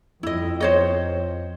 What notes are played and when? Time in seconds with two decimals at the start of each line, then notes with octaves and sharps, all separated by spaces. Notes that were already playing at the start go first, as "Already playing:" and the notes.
0.23 F2 E4 D#5
0.61 C5 C#5 D#5